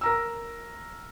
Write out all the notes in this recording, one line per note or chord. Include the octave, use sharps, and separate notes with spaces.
A#4 A#5 E6